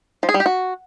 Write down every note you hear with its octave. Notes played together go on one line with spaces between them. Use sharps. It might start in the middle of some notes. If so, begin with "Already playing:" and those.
F3
G#4
G3
G4
F#4